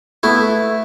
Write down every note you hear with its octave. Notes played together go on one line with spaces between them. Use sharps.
A3 B3 E4